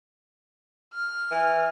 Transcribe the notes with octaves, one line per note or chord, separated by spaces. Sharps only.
F6
E3